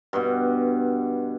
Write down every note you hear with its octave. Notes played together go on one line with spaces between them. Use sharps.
G2 B2